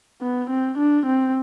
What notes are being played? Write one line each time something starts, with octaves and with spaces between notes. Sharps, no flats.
B3
C4
D4
C4